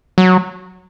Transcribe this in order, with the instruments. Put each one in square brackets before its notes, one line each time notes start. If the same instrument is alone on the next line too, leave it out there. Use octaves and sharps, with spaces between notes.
[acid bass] F#3